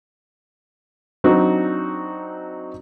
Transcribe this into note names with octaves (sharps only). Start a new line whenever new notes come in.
F#3 C4 D4 D#4 F#4